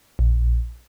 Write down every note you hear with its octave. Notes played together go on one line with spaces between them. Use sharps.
A#1